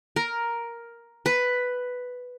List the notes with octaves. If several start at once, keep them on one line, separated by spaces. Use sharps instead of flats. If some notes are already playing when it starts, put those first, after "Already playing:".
A#4
B4